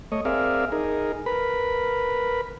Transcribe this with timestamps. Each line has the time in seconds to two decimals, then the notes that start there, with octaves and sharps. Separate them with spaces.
0.12 A3 C#5 D#5
0.25 C4 G#4 A#4 D5 E5 F5
0.72 D#4 G#4 A#4
1.26 A#4 B4 B5